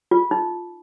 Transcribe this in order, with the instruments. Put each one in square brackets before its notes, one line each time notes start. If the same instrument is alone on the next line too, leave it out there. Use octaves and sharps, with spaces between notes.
[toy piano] F4
D#4